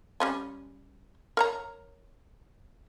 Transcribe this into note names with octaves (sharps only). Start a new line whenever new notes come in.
G3 C#4 G#5
A#4 C#5 A#5